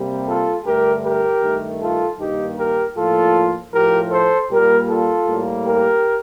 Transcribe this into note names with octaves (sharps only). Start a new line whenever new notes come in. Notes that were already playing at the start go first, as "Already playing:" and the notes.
Already playing: C3 G3 A#3
F4 A4
G2 D3 A3 G4 A#4
G4 A#4
G2 D#3 A3
F4 A4
G2 D#3 A#3 D#4 G4
G4 A#4
A2 F3 A#3 F4 A4
A2 F3 A3 G4 A#4
A4 C5
A#2 G3 A#3 G4 A#4
F4 A4
A2 G3 A#3
G4 A#4